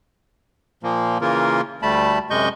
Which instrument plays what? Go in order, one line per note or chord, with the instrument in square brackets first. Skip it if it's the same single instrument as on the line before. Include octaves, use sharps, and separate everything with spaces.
[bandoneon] A#2 F3 A#3
C#3 E3 A#3 F4 A#4
D2 G3 A3 A5 B5
F#2 C3 G#3 D#5 C#6 G6